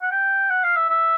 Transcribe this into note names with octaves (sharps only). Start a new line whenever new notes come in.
F#5
G5
F#5
F5
E5
E5